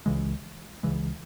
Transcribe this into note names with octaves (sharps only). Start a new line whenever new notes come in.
C#2 C#3 E3 G#3
C#2 C#3 E3 G#3